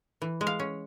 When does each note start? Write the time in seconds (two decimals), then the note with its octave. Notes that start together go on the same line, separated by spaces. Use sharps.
0.22 E3
0.41 G#3
0.47 F5
0.59 C#4